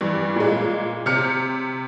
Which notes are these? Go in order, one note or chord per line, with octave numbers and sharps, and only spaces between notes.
G2 E3
A#2 G#3
C3 F6 C#7